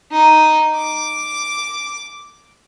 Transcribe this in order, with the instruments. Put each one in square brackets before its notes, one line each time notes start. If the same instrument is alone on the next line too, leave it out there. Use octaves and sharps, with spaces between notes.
[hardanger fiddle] D#4
D6